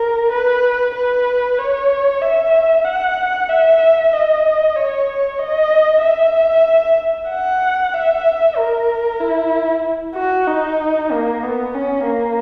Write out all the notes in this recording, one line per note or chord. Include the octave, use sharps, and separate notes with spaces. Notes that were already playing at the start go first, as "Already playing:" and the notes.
Already playing: A#4
B4
B4
C#5
E5
F#5
E5
D#5
C#5
D#5
E5
F#5
E5
A#4
E4
F#4
D#4
A#3
B3
C#4
A#3